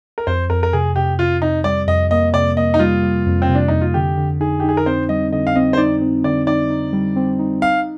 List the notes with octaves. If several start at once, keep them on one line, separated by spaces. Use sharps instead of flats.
A#4
F2 C5
F2 A#4
A#4
C3 G#4
C3 G4
C3 F4
C3 D#4
G3 D5
F2 D#5
A#3 D#5
C3 D5
A#3 D#5
D#4
G3 F4
G3
F2
C4
C3
D4
F2 D#4
F4
D3 G4
D3
D#4 G#4
D#4 G4
G#4
A#4
C4 C5
G3 D#5
D3 D#5
F5
C4 D#5
C5
D#4 D5
C4
D3 D5
D#4 D5
D#4
G3
C4
D#4
D#4 F5